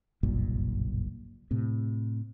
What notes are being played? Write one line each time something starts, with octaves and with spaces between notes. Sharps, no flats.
F#1 B1 G2 A#2
A2 C3